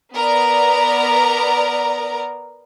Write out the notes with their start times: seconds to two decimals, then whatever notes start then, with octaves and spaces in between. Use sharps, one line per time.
0.14 B3 A#4 D5 A#5